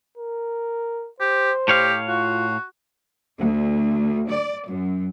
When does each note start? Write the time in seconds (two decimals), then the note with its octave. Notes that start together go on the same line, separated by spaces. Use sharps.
0.18 A#4
1.21 G4 C5
1.68 A2 G4 C#5 F5
2.08 F4 F#4
3.37 D2
4.29 D5
4.67 F#2